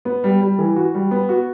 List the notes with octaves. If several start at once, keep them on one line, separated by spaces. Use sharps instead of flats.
B3
G3
G3
E3
F#4
G3
B3
F#4